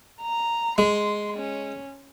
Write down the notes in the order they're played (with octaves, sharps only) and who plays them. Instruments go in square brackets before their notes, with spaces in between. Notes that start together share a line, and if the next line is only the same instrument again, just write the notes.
[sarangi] A#5
[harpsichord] G#3 [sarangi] C6
[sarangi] C#4